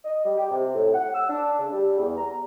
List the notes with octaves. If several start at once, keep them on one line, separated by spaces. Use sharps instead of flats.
D#5
G3
G4
C3
A2
F#5
E6
D4
C#3
G3
E2
A#5